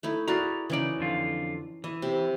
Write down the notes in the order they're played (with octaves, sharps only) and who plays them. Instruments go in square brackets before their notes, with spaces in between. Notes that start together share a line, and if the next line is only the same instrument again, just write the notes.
[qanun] A3 D#4 E4
[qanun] E4 F#4 A#4 [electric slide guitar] G#4 D5 A#5
[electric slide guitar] C#3 D5 [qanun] E3 C#4 D#4
[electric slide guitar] F2 D3 F4
[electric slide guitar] E3 [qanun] D#5
[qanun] C3